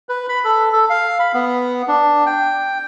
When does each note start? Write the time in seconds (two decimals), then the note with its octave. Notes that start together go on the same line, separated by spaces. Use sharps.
0.09 B4
0.29 B5
0.45 A4
0.73 A4
0.90 F5
1.19 B5
1.34 B3
1.88 D4
2.26 G5